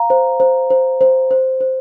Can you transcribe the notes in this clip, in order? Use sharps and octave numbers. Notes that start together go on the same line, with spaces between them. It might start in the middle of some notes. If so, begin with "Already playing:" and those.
Already playing: F5 A#5
C5
C5
C5
C5
C5
C5